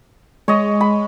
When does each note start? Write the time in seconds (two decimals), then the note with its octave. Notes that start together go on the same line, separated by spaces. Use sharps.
0.48 G#3 C#5 D#5
0.81 B5